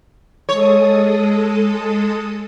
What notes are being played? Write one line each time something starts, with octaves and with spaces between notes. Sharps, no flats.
G#3 A4 C#5 D#6